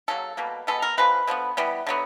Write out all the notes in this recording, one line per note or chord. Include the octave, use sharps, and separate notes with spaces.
C#3 F#3 A#3 A4
B2 G3 A#3
B2 G#3 B3 A4
A#4
D3 F3 G#3 B4
D3 F3 G#3 B3
E3 G3 B3
D3 F#3 B3